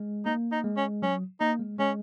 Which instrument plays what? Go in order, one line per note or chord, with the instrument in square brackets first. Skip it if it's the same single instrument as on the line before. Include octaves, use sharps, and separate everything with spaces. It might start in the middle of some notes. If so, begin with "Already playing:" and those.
Already playing: [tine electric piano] G#3
[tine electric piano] A#3 [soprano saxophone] D#4
[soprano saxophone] D#4
[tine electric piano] G#3
[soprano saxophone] C#4
[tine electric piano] F#3 [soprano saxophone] C#4
[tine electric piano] A#3 [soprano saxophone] D#4
[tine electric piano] G#3
[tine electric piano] G#3 [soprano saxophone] C#4